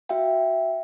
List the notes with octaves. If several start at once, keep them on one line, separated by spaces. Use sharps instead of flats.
F#4 E5 F5 G5